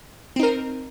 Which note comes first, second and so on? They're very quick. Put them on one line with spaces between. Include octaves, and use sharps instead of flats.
C4 D#4 A#4